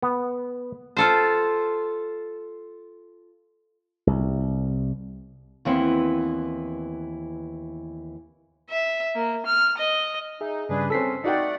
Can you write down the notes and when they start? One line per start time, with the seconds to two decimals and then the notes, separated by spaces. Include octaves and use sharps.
0.02 B3
0.97 F4 A4 C5
4.07 C2
5.65 D#2 E3 B3 C4
8.70 E5
9.15 A#3
9.46 F6
9.78 D#5
10.41 D#4 G#4 E5
10.69 G2 C#3 G3 D4 G#4 B4
10.90 G#3 C4 C#4 A4 E6 B6 C7
11.24 A3 D#4 F#4 D5 F#5 G5